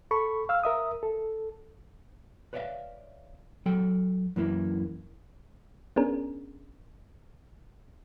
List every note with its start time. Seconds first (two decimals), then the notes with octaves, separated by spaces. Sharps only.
0.11 A4 B5 C#6
0.49 F5 E6 F6
0.64 A#4 E5 D#6
1.03 A4
2.53 B4 C#5 D5 E5 F5
3.66 F#3 A4 G5
4.36 F#2 E3 A#3 E4
5.96 B3 C#4 D4 G#4 A#4